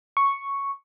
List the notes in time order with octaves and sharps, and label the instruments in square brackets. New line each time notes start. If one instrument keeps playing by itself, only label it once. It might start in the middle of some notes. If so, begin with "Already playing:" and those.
[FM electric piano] C#6